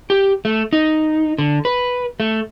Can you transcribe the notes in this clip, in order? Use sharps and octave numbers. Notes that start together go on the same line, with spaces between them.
G4
A3
D#4
D3
B4
A3